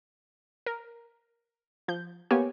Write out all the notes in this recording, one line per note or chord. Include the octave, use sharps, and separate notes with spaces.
A#4
F3 G6
A#3 B3 G4 C#5 G#5